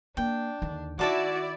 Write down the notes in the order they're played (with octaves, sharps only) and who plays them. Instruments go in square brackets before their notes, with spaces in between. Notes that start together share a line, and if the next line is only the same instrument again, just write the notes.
[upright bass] A#3 [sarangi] D4 [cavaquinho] G5
[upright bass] D#2 D3
[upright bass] D#3 [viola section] E4 D5 [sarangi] F#4 [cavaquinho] E5 A5 D6